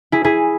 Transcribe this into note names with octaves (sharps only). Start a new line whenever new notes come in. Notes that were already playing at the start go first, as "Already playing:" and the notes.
E4 G#4
E4 G#4